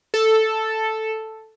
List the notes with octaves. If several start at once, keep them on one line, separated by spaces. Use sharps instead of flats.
A4